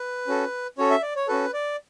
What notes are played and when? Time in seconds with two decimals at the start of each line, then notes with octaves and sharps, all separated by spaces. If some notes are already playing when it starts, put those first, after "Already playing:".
Already playing: B4
0.27 C#4 F#4 A4
0.78 C#4 F#4 A4 C#5
0.90 E5
1.02 D5
1.16 C#5
1.27 C#4 F#4 A4 B4
1.54 D5